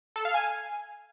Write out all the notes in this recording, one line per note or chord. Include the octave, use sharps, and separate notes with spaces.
A4
F5
G#5